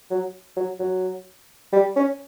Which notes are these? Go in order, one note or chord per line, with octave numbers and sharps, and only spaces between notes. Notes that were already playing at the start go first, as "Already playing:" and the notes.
F#3
F#3
F#3
G3
C#4